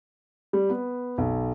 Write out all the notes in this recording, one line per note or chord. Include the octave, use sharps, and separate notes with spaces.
G3
B3
B1